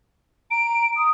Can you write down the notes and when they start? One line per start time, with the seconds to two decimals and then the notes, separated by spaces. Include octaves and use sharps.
0.51 A#5 D7
0.97 D#6